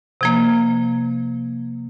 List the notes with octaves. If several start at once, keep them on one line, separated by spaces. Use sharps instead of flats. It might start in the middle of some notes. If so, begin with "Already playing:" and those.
C3 F3 A#3